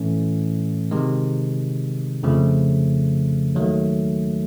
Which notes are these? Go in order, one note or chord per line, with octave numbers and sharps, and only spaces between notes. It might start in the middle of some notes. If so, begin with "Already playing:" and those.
Already playing: A2 E3 A3 C#4
C3 D#3 G#3
F2 C#3 F3 A3
D#2 D#3 F#3 A3